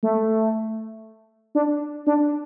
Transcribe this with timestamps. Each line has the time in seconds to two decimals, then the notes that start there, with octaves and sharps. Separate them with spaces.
0.03 A3
1.55 D4
2.07 D4